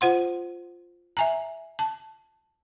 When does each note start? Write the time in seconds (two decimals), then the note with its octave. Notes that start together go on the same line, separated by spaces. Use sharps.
0.01 F4 C5 F#5 C6
1.17 E5 G#5 A#5
1.79 A5